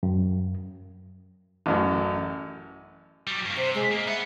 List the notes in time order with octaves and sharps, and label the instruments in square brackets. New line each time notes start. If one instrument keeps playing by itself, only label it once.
[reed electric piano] F#2
[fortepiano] A1 F#2
[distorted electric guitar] F#3 G3
G2 A#3
[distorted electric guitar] C3 [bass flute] C5
[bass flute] G#3
[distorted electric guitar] A#3
[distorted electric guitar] B3 F#5 [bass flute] E5